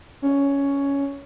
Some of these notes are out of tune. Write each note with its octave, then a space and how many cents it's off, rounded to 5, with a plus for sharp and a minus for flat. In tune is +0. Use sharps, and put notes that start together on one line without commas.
C#4 +10